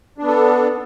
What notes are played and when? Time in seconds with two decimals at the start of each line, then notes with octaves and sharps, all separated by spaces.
0.18 D4
0.23 B3
0.27 A4